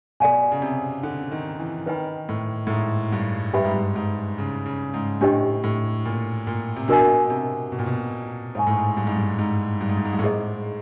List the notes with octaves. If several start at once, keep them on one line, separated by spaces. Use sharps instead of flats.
B2 A4 D5 F5 G#5
C#3
C3
D3
D#3
E3
D#3 B4 D#5 G5 B5
A2
A2
G#2
G2
G2 G4 B4 E5 G5 B5
G#2
G2
G#2
C#3
C#3
G#2
A2 D4 G4 C5 D#5 G5
A2
A#2
A#2
C3
B2 D4 F#4 A#4 D#5 G#5
C3
B2
A#2
B2
G#2 C5 F5 G#5 C#6
A2
G#2
G2
G#2
G2
G#2
G2
G#2
G2
G#2
G2
A2
G#2 E4 G#4 C5 D#5